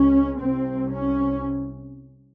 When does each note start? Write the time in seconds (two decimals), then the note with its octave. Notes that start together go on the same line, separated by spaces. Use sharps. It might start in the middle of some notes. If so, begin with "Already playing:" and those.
Already playing: C#2 C#3 C#4
0.40 C2 C3 C4
0.91 C#4